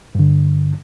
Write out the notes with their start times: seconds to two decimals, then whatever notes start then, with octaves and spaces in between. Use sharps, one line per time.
0.15 G2 D3